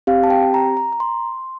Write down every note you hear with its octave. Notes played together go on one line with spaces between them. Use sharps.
C4 G4 F5
A5
G5
A#5
A#5
A#5
C6